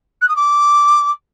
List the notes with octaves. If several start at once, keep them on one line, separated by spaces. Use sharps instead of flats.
F#6
D#6
D6